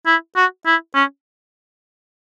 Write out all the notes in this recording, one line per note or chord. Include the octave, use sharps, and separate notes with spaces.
E4
F#4
E4
C#4